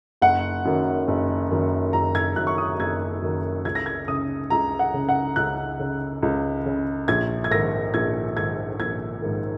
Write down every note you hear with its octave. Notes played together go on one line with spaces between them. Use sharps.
F#1 F#5
F#2 D#3
F#1
F#2 D#3
F#1 A#5
G#6
F#2 D#3 F#6
C#6
D#6
F#1 G#6
F#2 D#3
C#2 G#6
A#6
G#6
C#3 D#6
C#2 A#5
F#5
C#3
F#5
C#2 F#6
C#3
C#2
C#3
A#1 G#6
G#6
G#2 D#3 A#6
A#1 G#6
G#2 D#3 G#6
A#1 G#6
G#2 D#3